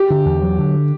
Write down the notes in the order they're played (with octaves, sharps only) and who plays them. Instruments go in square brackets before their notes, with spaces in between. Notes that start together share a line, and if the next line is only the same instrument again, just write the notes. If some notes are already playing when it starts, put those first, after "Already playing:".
Already playing: [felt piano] G4
[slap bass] D3
E2
F#3
D3